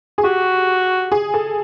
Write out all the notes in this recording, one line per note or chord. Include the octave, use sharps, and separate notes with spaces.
G#4
F#4 G4
G#4
A4